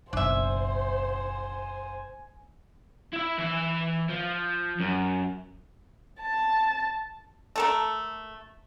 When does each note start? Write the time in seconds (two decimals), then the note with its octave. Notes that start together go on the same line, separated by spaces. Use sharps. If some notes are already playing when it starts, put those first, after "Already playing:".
0.13 F#1 B1 D4 C5 E5 G#5
3.13 E4 E5
3.38 E3 E5
4.09 F3
4.80 F#2
6.20 A5
7.56 A3 A4 A#4